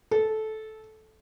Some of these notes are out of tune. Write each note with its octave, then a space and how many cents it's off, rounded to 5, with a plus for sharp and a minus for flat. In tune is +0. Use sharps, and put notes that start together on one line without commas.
A4 -15